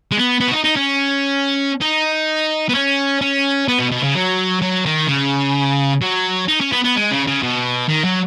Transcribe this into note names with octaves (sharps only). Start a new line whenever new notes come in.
G#3
B3
B3
F#4
D#4
D#4
C#4
D#4
B3
C#4
C#4
B3
B2
B2
C#3
F#3
F#3
D#3
C#3
F#3
D#4
C#4
B3
B3
G#3
C#3
C#3
B2
D#3
F#3